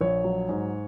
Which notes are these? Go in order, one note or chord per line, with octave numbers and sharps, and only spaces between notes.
A#1 C#5
F#3
G#2